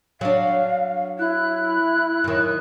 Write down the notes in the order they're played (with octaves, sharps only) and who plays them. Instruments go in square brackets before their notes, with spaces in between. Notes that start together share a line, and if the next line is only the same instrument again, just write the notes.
[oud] F#3 D4 [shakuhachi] F5
[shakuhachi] E4 [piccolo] F#6
[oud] F#2 D#3